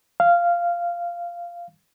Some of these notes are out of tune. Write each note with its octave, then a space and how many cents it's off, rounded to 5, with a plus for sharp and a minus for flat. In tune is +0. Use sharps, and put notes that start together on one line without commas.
F5 -10